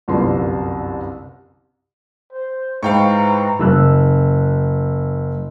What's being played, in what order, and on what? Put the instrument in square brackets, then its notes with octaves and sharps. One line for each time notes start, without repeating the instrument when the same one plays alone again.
[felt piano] G1 C2 F#2 C3 F4 C6
[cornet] C5
[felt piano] G#2 [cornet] E4 [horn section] B4 C5 A#5 [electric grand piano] F5 G5 C#6
[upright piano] F#1 E6 F#6